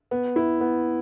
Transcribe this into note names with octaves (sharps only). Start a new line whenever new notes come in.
B3
E4
B3